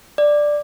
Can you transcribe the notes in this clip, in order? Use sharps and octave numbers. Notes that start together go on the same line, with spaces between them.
D5